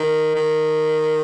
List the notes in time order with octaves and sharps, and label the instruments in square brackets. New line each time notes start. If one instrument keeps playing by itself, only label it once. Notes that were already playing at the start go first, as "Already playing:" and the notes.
Already playing: [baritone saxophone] D#3
D#3